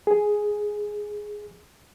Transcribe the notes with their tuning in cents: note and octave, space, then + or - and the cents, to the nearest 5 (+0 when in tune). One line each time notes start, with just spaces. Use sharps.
G#4 +5